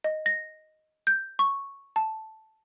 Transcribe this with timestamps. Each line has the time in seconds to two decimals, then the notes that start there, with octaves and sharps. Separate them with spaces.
0.04 D#5
0.26 A#6
1.07 G6
1.39 C#6
1.96 A5